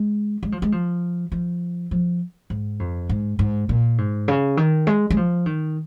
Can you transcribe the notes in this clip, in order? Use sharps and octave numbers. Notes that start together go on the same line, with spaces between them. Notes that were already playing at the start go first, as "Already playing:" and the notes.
Already playing: G#3
G#3
F3
G#3
F3
F3
F3
G#2
F2
G#2
G#2
A#2
G#2
C#3
D#3
G#3
G#3
F3
D#3